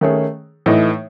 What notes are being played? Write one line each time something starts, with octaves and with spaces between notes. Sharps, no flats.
D#3 A3 C#4 G#4
A2 E3 A3 D#4